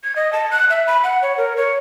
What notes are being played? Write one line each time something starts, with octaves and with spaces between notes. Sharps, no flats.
G#6
D#5
A5
F#6
E5
B5
F#5
C#5
A#4
C#5